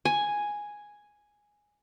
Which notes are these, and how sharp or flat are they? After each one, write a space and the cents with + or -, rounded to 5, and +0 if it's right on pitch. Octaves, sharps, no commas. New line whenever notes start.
G#5 +0